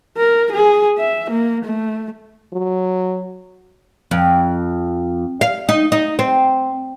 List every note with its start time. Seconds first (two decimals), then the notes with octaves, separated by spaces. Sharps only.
0.17 A#4
0.52 G#4
0.98 E5
1.31 A#3
1.65 A3
2.53 F#3
4.11 F2
5.41 F5
5.69 D#4
5.92 D#4
6.19 C4